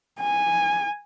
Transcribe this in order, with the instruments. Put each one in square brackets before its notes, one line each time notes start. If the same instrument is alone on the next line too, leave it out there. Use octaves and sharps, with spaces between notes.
[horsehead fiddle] G#5